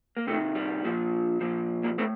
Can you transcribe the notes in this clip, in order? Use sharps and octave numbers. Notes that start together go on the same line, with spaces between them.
A#3
C3 D#3 A3
G3
A#2 F3
A#2 F3
G3 A#3
A2 A3 C4